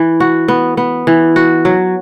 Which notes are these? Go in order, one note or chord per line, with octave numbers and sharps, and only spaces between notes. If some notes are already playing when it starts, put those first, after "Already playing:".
Already playing: E3
F#4
B3
B3
E3
F#4
F#3